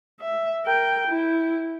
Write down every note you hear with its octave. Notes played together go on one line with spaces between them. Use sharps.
E5
A#4 G5
E4